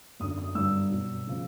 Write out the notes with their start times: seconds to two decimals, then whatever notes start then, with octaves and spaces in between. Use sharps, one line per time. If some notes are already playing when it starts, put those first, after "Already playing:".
0.20 F#2 D3 F#3 D#6
0.38 D#6
0.55 G2 D3 F#3 E6
0.90 B2 F#3
1.27 C#3 F3